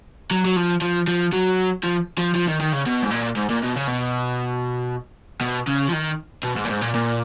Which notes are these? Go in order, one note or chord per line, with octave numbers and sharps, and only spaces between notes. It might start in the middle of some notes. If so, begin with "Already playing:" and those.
F#3
F#3
F3
F3
F3
F#3
F3
F3
F3
D#3
D#3
C#3
B2
G#2
A#2
G#2
A#2
B2
C#3
B2
B2
C#3
F3
D#3
B2
G#2
A#2
G#2
A#2
A#2